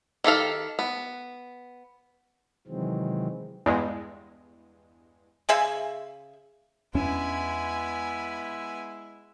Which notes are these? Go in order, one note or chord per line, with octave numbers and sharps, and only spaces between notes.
D#3 G4 A4 F5
B3
C3 D#3 E3 F#3 G#3 C4
E2 G2 G#3
C#3 G#4 E5 G#5
E2 G#3 B3 C#4 D4 E4 G#5